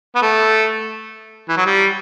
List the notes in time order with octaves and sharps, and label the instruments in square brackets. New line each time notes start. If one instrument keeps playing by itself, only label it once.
[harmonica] B3
A3
E3
F#3
G3